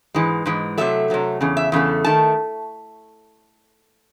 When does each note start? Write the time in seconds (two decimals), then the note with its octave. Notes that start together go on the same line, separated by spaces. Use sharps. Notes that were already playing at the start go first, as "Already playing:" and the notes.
0.15 G#2 E3 G#3
0.46 G#2 E3 G#3
0.78 C3 F#3 A3 E5
1.10 C3 F#3 A3
1.41 E2 C#3
1.57 E5
1.72 E2 C#3 A3
2.05 D#3 A3 A5